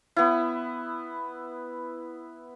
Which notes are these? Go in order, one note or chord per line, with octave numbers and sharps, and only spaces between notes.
B3 E4